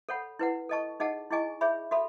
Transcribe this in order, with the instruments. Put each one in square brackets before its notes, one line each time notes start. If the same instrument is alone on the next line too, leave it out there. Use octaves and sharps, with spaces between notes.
[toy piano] A4 C#5 F#5 B5
E4 B4 F#5
A4 D#5 A5 C#6
D#4 G#4 D#5 F#5 A5
E4 G#4 D#5 G#5 C#6
G#4 C#5 E5 B5
F#4 A4 E5 B5